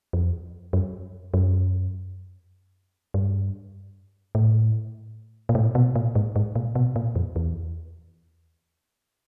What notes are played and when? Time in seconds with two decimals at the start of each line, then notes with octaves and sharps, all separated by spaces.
0.13 F2
0.73 F#2
1.34 F#2
3.14 G2
4.35 A2
5.49 A#2
5.55 A2
5.75 B2
5.95 A#2
6.15 G#2
6.36 G#2
6.55 A#2
6.75 B2
6.96 A#2
7.15 F2
7.36 E2